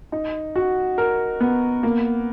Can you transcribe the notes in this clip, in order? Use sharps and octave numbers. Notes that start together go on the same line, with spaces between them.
D#4
F#4
A#4
B3
A#3